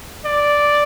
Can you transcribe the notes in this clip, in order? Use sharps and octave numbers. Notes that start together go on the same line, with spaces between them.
D5